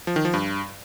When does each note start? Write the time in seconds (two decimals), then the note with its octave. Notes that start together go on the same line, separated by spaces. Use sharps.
0.07 F3
0.16 D#3
0.25 F3
0.34 G2